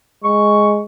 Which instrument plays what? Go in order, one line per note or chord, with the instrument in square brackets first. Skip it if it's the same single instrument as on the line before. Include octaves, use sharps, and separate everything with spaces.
[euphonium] G#3 [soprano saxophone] C#6